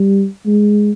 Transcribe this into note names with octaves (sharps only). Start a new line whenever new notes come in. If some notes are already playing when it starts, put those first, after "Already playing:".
Already playing: G3
G#3